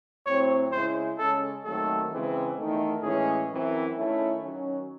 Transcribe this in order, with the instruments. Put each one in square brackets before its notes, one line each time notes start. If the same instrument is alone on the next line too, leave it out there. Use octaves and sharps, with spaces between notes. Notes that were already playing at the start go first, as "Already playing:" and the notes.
[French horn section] A2 F#3 C4 [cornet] C#5
[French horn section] C#3 G#3 C#4 E4 [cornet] C5
[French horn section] C#3 G#3 C#4 [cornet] A4
[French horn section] D#2 D#3 F#3 A3 C4 [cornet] A4
[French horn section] C#3 E3 G#3 C4
E2 D#3 A3 D#4
[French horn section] A2 E3 G#3 C#4 [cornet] G#4
[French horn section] F#2 E3 C4 E4
D#3 A3 C#4 E4
D#3 F#3 C#4